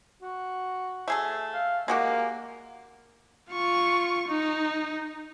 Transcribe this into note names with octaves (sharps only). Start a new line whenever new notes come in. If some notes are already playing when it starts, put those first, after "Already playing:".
F#4
A3 G#4 A4
F5
G#3 A#3 F#4 G4
F4 C#6
D#4